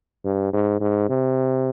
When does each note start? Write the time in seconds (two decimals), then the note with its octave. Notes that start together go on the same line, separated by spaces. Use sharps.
0.25 G2
0.53 G#2
0.80 G#2
1.09 C3